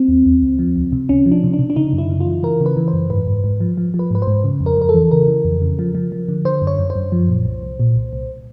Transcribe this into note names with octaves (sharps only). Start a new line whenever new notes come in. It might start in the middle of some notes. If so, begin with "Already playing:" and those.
Already playing: C4
D#2
D#2
C#2
F3
C#2
C3
C#2 C#4
F3
D4
C3
D4
C3
D4
C#3 D#4
F#2
E4
C#3
F4
E3
E3 A#4
C#3
B4
E3
C5
F#2
G#2 B4
G#2
G#2
F3
F3
F3
B4
G#2 B4
C5
G#2
C#3
F2
A#4
F2 A#4
A4
E3
C#3 A#4
E3
F2
C#3
F3
F3
F3
D3
D3 C5
F#2
C#5
F#2
C5
F#2
F3
A#2
C2
C2
A#2
C2
C2